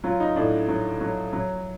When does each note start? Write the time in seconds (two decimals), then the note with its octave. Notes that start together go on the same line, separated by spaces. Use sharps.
0.04 F#3 F4
0.20 D#4
0.36 A2 D4
0.68 F#3
1.01 F#3
1.33 F#3